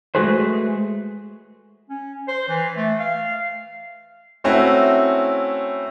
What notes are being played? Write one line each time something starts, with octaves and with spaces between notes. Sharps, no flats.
G#3 A3 F#4 G#4 B4 C5
C#4
C5
E3
A3
F5
A3 C4 C#4 E4 F#4